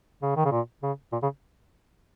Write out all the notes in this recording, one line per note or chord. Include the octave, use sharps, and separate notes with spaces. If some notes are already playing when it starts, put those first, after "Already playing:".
C#3
D#3
C#3
A#2
C#3
A#2
C#3